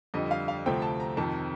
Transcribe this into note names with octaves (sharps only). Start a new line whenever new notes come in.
F2 D3 G3 D#5
F5
F5
D2 C3 F3 A3 C4 G5
A5
A#5
F2 C3 D#3 A5